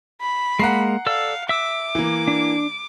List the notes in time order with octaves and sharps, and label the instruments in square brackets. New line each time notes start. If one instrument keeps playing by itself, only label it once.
[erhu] B5
[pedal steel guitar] G#3 A#3 [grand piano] F#5 A#5 C7
[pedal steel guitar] A4 D5 E6 [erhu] F5
[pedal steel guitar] E5 E6 [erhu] D6
[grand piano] E3 A#3
[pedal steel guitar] D4